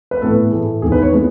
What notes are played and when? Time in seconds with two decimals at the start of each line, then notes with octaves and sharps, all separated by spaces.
0.11 B4
0.22 A2 E3 B3 A4
0.51 A2 E3 A3 G#4
0.82 E2 D#3 G#3 G#4
0.92 B4
1.02 C#5
1.13 E3 G#3 B3